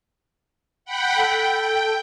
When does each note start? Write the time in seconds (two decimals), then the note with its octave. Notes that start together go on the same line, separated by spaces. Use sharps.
0.85 F#5 G5 B5
1.17 A4 G5